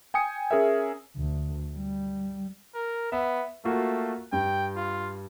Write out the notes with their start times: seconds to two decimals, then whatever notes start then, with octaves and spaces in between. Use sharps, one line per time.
0.14 G5 G#5 D#6 C#7
0.51 C#4 G#4 A#4 E5
1.17 D2
1.76 G3
2.75 A#4
3.12 B3 E5
3.65 A3 A#3 F4 F#4
4.32 G2 G5
4.76 F4